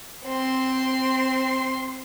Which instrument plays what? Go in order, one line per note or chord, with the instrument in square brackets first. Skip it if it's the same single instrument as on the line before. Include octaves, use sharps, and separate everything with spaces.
[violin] C4 C6